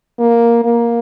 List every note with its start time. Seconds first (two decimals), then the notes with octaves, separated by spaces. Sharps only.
0.19 A#3
0.65 A#3